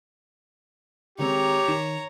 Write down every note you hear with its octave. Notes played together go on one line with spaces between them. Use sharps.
D#3 G#3 C4 G4 C#5 A#5
D#3 E7